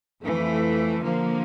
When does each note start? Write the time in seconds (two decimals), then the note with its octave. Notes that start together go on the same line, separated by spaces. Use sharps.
0.23 F2 E3 A3
1.01 D3 F3 A#3